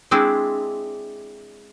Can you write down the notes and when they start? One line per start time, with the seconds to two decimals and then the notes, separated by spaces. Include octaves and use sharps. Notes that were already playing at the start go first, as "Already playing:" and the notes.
0.11 G#3 C4 D4 E4